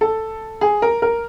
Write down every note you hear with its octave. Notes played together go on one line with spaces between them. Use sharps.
A4
G#4
A#4
A#4